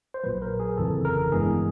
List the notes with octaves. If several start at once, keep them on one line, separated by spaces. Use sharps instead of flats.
C5
A#1 A#2 F#3 B4
A#4
G#4
G1 F2 C#3 E3 A4
A#4
G2 E3 G#3 B3 G#4